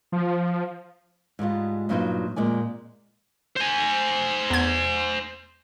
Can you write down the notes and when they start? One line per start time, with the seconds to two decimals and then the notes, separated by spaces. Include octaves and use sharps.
0.12 F3
1.39 G#2 G3 G#3 F4
1.89 G2 A#2 F#3 D#4 C5 D#5
2.36 F2 A#2 G#3 D5 G#5
3.56 C5 G#5
4.50 E2 G#6